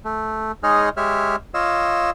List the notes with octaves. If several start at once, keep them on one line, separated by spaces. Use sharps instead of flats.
A3
G#3 D#4 G#4 C#5 D#5 F6
G#3 G4 C#5 E5 F6
F4 C#5 D#5 F5 E6